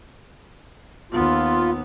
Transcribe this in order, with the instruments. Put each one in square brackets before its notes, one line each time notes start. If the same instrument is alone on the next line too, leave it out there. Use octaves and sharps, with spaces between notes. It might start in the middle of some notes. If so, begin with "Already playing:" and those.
[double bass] D#2 B3 [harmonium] F4